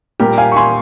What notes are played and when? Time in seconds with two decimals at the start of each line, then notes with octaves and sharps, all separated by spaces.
0.20 A#2 G3 A#3 G4 A#4
0.38 F5 G#5
0.52 C#6
0.56 G#5 C6